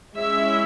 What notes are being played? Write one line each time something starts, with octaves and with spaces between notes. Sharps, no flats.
G#3 C#4 E4 E5